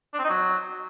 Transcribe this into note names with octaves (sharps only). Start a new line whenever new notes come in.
D4
C4
D#4
F#3